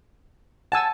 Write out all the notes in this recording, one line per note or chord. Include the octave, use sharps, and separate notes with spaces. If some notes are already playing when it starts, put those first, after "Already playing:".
F#5 G#5 A5 E6